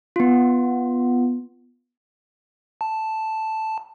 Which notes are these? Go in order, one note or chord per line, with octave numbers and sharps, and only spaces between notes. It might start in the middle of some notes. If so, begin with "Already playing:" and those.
B3 F4
A5